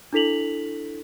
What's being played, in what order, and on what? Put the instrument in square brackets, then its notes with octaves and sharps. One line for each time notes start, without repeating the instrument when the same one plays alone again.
[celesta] D4 E4 A4 B6 F7 F#7